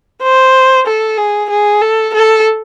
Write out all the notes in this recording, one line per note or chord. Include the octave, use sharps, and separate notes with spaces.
C5
A4
G#4
G#4
A4
A4